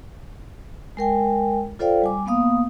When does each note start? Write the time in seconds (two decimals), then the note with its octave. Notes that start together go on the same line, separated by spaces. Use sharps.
0.97 G#3 A#4 G5 G#5
1.79 F4 A4 C5 D5 F5 G5
2.02 G3 G#5 D6
2.26 A#3 B3 F5 D#6